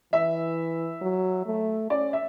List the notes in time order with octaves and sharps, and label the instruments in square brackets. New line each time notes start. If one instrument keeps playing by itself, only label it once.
[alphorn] E3 [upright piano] E5
[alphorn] F#3
A3
[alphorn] C#4 [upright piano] D5
[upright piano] E5